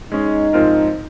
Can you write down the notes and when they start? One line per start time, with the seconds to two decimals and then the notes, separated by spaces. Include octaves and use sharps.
0.12 G#3 C#4 D#4 G#4
0.53 G#2 F3 C4 F4 A#4